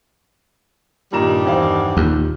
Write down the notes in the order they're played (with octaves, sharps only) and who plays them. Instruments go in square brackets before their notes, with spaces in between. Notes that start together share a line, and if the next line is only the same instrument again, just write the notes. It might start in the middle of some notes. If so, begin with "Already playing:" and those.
[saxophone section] G2 D#3 G3 [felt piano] A#2 A#5 E7
[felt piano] E2 C5 F5
[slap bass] D#2 [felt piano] A#2